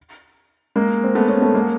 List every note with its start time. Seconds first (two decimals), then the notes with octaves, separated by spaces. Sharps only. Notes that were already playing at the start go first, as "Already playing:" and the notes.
0.76 G#3 A#3
1.04 C4
1.15 A3 B3
1.28 B3 C#4
1.41 A3 B3
1.54 G#3 A#3